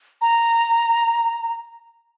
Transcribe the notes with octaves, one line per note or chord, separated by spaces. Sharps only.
A#5